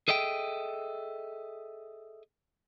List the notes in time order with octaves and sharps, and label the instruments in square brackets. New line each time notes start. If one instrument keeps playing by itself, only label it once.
[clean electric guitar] G#4 A4 D#5 E5 G5